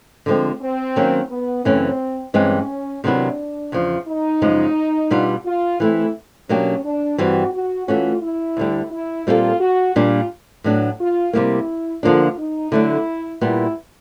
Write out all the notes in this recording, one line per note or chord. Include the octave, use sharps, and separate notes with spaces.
D3 F3 G#3 C4
C4
D#3 F#3 A#3 C#4
B3
F#2 C#3 E3 A3 C4 C#4
G2 E3 G#3 C4 C#4
C3 D#3 F#3 B3 D4 E4
E2 C#3 F3
D#4
F#2 C#3 F3 G#3
B2 G3 B3 D4 F4
F4
E3 A3 C4 E4
B2 F#3 A#3 C#4 D4 G4
D4
G2 E3 G3 C4 F#4
F#4
E3 A3 C#4 F4 F#4
E4
D2 D3 G3
E4
A#2 G3 C4 E4 F4 A4
F#4
A#2 G3 A#3 D4 F4
A2 F#3 B3 D4
F4
C3 D#3 G3 A#3 E4
D3 F3 A#3 D4 F4
D#4
D3 F#3 A3 D4 E4
A#2 G3 B3 E4